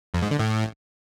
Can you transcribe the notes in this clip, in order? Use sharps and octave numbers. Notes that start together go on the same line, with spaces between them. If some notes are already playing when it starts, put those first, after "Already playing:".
F2
G#2
D3
A2